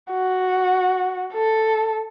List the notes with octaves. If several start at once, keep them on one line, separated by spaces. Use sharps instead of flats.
F#4
A4